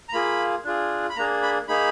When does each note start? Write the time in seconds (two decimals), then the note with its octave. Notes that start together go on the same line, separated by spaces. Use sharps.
0.09 A#5
0.13 A#3 F4 G#4 B5
0.64 D4 F4 G#4
1.09 B5
1.16 A#3 D4 G#4 A#5
1.42 B5
1.68 A#3 D#4 G#4 B5